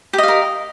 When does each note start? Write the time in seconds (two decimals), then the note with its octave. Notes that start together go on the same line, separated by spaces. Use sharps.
0.13 G4
0.18 D#5
0.23 F5
0.28 A#4